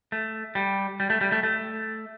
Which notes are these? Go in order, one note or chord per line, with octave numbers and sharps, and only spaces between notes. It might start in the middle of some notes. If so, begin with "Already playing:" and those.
A3
G3
G3
A3
G3
A3
A3